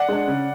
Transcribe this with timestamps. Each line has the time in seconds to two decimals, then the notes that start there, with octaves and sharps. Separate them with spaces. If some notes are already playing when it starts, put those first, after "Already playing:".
Already playing: D5 F#5
0.08 G#3 D4
0.28 C#3